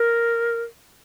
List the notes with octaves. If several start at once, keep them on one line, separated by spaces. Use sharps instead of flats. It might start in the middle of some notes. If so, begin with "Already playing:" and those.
Already playing: A#4